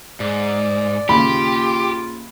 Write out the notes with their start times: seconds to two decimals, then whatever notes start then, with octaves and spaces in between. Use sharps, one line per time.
0.20 G#2 D5
1.09 D#2 A#2 C#3 F4 G4 B5